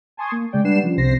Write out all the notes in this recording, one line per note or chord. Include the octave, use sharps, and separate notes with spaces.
G#5 A5 C6 C#6 D#6 G#6
A#3
C#3 G#3 D5 G5
G3 D4 B4 F#5 C7 E7
C#3 F3
C2 C3 C5 A#6 C7